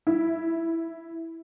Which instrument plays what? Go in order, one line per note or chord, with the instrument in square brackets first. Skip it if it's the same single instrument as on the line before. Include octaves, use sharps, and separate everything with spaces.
[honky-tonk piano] E4